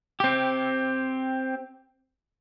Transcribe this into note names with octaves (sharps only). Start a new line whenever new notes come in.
C4 G4